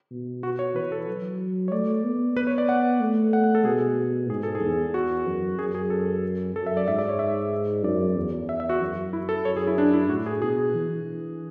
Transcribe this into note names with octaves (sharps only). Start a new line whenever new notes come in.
B2
F#4
C#5
E3 B4
A4
F#3
C#5
A3 D5
B3
B4
C#5
D5
F#5
A3
F#5
F#5
A4
B2 G#4
G#2 G#4
A4
G#4
E2
F#4
F#2
F#2 G#4
G#4
A4
F#2 A4
E5
D5
G#2 E5
D5
C#5
E5
F#2 D5
E2
E5
E5
F#4
F#2
E4
A4
F#2 C#5
G#4
E4
D4
E4
A2 F#4
G#4
B2 G#4
E3